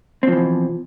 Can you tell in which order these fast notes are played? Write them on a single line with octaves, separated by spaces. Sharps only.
C4 F3 E3 B2